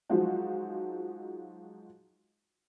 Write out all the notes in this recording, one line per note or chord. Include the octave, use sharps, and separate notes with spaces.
F3 F#3 G#3 D#4 F4 F#4